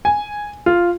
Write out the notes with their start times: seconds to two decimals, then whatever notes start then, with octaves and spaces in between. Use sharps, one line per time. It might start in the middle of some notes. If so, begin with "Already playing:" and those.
0.05 G#5
0.66 F4